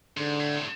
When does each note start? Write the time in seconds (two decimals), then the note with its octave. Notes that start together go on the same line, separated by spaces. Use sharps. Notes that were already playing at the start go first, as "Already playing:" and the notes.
0.17 G#2 D3
0.39 A2
0.56 C3